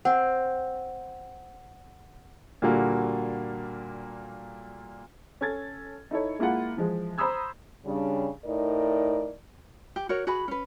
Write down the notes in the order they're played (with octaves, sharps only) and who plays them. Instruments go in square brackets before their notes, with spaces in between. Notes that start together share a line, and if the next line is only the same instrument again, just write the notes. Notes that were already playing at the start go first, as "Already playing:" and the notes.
[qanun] C4 [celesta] F#5
[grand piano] A#2 D3 G3 A#3 F#4
[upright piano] C#4 A4 G#6 A6
D#4 E4 A4 C#5
G#3 A#3 E4 F4 F#5
E3 F3 G#3
C5 A#5 B5 D#6 E6 G#6
[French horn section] C#3 G3 D4
A2 D#4 A#4 D5
[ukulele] G4
F#4 A#4 C#5
F#4 G#4 B4 B5
C#4 B4